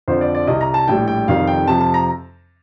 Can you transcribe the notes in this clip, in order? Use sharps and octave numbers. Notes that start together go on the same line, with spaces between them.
F2 D3 F3 C5
D5
D5
C2 C3 G3 D#5
A#5
A5
A#1 A2 G3 G5
G5
F1 F2 D#3 G3 F5
G5
F2 C3 F3 A5
A5
A#5